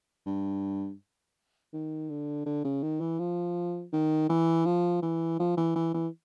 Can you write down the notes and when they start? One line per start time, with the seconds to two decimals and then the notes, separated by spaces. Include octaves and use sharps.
0.26 G2
1.73 D#3
2.10 D3
2.46 D3
2.64 C#3
2.83 D#3
3.00 E3
3.19 F3
3.93 D#3
4.29 E3
4.65 F3
5.02 E3
5.39 F3
5.57 E3
5.76 E3
5.94 E3